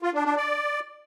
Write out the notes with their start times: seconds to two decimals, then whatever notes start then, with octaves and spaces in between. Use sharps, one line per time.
0.02 F4
0.14 D4
0.25 D4
0.36 D5